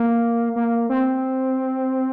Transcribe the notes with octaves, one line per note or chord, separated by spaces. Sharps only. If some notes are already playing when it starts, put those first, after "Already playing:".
Already playing: A#3
A#3
C4